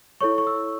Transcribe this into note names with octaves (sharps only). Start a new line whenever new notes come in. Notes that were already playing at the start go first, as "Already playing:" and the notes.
E4 A4 C#5 C#6
C#6
E6